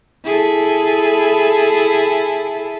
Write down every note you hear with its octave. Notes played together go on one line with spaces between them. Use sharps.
E4 G#4 A4